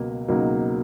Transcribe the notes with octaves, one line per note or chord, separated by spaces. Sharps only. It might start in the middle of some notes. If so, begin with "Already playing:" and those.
Already playing: C#2 B2 F#3 A#3
C#2 B2 F#3 A#3 D#4